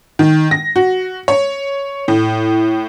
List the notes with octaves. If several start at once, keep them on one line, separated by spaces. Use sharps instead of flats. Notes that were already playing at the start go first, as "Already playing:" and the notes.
D#3
A#6
F#4
C#5
A2